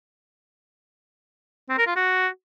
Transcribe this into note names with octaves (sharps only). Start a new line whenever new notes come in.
C4
A#4
F4
F#4